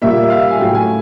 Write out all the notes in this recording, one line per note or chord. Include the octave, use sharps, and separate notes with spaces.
A#2 G3 A#3 E5
E5
F5
G#5
A2 F#3 A3 G5
G#5